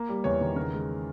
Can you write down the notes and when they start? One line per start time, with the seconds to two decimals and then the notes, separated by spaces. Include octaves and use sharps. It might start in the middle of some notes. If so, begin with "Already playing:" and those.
Already playing: A#3
0.09 G3
0.24 E2 C#5
0.41 D#3
0.56 C#3 A#4
0.73 G#3